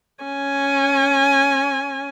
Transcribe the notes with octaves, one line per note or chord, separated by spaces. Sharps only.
C#4 G#5